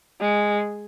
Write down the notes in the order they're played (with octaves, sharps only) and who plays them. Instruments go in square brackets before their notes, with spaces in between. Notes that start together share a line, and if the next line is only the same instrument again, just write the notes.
[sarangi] G#3